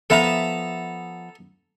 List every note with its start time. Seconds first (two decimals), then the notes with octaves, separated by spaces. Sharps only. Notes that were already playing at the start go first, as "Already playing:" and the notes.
0.10 F3 B3 A4 E5 A5 A#5